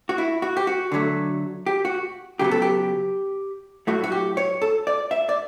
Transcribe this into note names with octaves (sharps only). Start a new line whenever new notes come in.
F#4
E4
F#4
G4
F#4
D3 F#3 A3
G4
F#4
C#3 F#3 B3 G4
A4
G4
A2 F#3 A3 F#4
F#4
G4
C#5
A4
D5
E5
D5